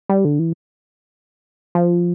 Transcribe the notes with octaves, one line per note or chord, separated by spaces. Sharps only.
G3
D3
E3
F3